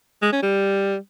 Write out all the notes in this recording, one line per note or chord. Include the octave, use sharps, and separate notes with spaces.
G#3
C#4
G3